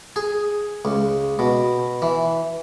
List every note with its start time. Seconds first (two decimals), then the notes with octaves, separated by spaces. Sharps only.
0.16 G#4
0.85 C#2
1.39 B2
2.02 E3